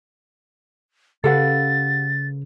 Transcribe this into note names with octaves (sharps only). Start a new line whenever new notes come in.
C#3 G4 A4 B4 F5 F#5 A6